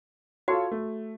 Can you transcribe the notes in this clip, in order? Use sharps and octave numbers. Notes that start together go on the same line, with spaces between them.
F4 F#4 A4 C#5
A3